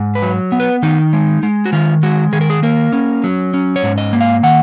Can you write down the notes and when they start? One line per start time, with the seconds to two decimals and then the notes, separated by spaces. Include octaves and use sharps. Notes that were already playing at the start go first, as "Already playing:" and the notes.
Already playing: G#2
0.15 B4
0.22 F#3
0.52 B3
0.60 B4
0.83 D#3 D#4
1.13 G#3
1.43 G#3
1.65 F#4
1.73 D#3 F4
2.03 G#3 F#4
2.33 D#3 G#4
2.41 A#4
2.50 G#4
2.63 A#3 A#4
2.92 C#4
3.24 F#3
3.54 C#4
3.76 C#5
3.83 G#2
3.98 D#5
4.13 A#3
4.21 F5
4.43 D#3 F#5